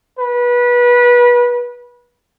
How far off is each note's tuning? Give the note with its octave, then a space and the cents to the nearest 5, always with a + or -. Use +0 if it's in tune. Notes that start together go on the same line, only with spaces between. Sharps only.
B4 -25